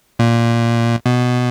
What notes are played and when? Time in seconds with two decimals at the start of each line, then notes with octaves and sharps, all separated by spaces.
0.19 A#2
1.06 B2